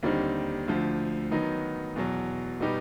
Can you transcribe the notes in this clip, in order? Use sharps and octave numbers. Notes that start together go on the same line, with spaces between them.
D#2 D3 G3 C4 D#4
D2 D3 F3
D#3 F#3 B3 D#4
E2 B2 F#3
B2 G3 B3 D#4 G4